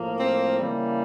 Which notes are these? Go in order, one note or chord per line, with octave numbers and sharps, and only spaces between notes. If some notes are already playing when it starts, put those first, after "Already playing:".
Already playing: A2 F3 A#3
C4
C#3 E3 G3 A#3